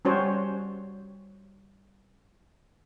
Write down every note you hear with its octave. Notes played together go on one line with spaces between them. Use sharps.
G3 C#4 F#4 C5 C#5